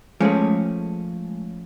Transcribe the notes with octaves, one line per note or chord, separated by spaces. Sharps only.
F3 G#3 A3 C#4